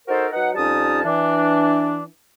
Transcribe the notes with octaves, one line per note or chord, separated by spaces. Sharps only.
D#4 F#4 A4 A#4 C5
F#3 D#4 B4 F#5
F2 G3 C#4 D#4 A5 D#6
E3 D4